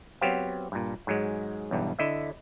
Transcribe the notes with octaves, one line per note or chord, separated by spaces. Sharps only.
F#3 B3 C4 G4 C5 F5
G2 A#2
G#2 F#3 G#3
B1 E2 G2
D3 E4 D#5 E5